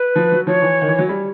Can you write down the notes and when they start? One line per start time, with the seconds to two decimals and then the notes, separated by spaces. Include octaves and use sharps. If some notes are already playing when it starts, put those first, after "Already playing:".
Already playing: B4
0.16 F3
0.32 F#3
0.47 F3 C#5
0.62 E3
0.81 D#3
0.88 E3
0.99 F#3
1.09 G3